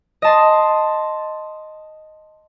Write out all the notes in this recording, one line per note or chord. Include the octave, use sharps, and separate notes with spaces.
D#5 A5 C6